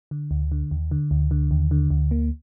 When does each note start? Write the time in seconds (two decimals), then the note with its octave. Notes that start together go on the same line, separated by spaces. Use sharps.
0.11 D3
0.31 D2
0.52 D3
0.71 D#2
0.91 D3
1.11 D2
1.31 D3
1.51 D#2
1.71 D3
1.90 D2
2.11 A#3